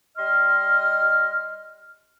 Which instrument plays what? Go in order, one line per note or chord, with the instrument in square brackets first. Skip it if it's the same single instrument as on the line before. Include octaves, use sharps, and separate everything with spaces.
[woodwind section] G3 D#5 C6 F6